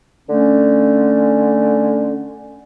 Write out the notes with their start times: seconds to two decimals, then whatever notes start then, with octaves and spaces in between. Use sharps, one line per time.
0.29 D3 A3 C#4